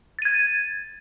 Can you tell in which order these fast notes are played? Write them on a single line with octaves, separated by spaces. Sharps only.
A6 D#7 G#6